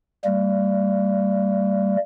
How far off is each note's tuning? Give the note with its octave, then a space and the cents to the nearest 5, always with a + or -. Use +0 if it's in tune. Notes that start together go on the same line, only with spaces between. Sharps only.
G3 +0 A#3 -35